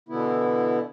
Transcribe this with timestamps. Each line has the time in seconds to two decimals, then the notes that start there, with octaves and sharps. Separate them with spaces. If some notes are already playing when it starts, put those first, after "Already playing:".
0.09 B2 D3 E3 B3 E4